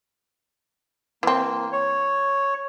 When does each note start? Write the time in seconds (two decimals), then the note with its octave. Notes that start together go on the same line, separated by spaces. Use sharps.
1.23 E3 A#3 C4
1.72 C#5